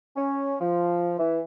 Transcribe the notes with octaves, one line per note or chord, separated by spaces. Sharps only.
C#4
F3
E3